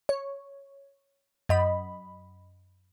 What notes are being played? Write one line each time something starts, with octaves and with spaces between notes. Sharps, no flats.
C#5
F#2 D#5 B5